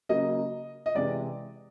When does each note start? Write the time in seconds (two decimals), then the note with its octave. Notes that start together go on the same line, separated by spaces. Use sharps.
0.09 C#3 F#3 A#3 D#5
0.86 D#5
0.95 C3 E3 G#3 D5